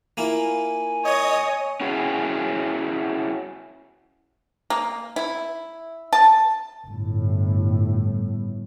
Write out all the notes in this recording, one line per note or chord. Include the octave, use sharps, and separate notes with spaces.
A#3 E4 F4 G#5
C#5 D#5 D#6
C#4 E4 F#4 G#4
A#3
E4
A5
G1 A2